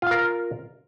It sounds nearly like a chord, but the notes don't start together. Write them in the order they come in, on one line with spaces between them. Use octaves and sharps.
F4 F5 A#4